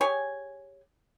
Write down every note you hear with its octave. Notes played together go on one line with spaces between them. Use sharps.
G4 G#4 C#5 G#5